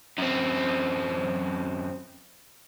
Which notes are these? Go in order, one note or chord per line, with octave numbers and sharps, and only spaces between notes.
F#2 C4